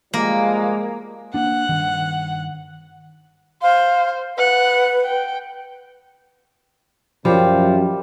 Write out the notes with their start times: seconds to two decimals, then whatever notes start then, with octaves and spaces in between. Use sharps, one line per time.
0.14 F3 G3 G#3 A#3
1.34 A#3 D4 F#5
1.69 G2 D#3
3.62 C5 F5
4.38 B4 F#5
5.05 G5
7.25 F#2 F3 G3